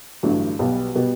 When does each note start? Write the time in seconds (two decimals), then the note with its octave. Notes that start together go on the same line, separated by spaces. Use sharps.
0.23 A1 G2 D3 F#3 A3
0.59 B1 B2 G3 B3
0.95 B2 G3 B3